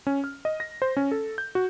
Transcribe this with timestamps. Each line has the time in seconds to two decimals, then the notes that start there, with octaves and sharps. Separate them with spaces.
0.07 C#4
0.24 F6
0.45 D#5
0.60 A#6
0.82 C5
0.97 C#4
1.11 A4
1.38 G6
1.55 F#4